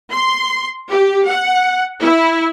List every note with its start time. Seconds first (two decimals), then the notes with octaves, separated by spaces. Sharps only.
0.11 C6
0.90 G4
1.28 F#5
2.01 E4